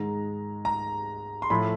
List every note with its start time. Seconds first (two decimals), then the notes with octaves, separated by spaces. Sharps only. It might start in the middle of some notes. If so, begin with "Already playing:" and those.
Already playing: G#2 D#3 G#3 A#5
0.65 A#5
1.42 C6
1.50 A2 F3 A3 B5